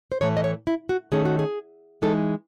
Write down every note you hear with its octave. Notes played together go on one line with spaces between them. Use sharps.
C5
A2 E3 A3 C#5
D#5
C#5
E4
F#4
D#3 A3 C#4 G#4
F#4
G#4
E3 G#3 D#4 A4